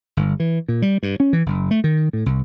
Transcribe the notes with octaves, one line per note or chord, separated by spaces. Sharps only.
G1
E3
A#2
G3
G2
C#4
E3
F#1
A3
D#3
A2
C2